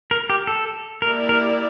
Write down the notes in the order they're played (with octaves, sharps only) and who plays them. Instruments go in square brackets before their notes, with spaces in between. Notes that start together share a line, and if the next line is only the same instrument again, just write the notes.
[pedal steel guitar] A#4
G4
A4
[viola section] A#3 E4 G4 D5 [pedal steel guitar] A#4
[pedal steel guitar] A#4